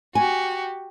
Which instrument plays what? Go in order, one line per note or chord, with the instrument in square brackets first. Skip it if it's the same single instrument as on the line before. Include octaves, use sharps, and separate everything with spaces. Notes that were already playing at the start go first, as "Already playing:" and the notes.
[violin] F#4 G4 [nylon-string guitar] G#5